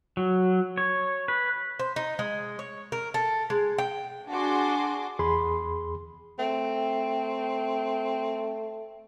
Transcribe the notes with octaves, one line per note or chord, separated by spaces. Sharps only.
F#3
C#5
B4
C5
D#4
G#3
C#5
A#4
A4
G#3
G5
D4 F#4 G#4 C6 D6
E2 G#4 B5 C6
A3 C4